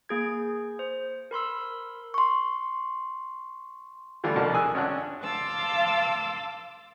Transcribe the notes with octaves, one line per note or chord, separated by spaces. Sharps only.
A#3 G#4 G#6
C5
A#4 B5 C6 E6
C6 C#6
D3 E3 G3 A3 F4
C2 B2 F3 A#4 D5 A5
G#4 G#5 E6 F#6
G#1 C#4 D4 F#5 F#6
F5 A5 C6 D6 E6